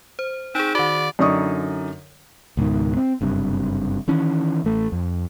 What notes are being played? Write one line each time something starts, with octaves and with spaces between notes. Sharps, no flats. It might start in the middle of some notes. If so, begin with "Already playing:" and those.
C5
C4 D#4 G#4
D#3 F#4 D5
F#2 D3 D#4 D5 C#6 D#6
C#2 G#2 B2 D#3
C4
F#1 G2 C3
D#3 E3 C#4
A1 A3
F2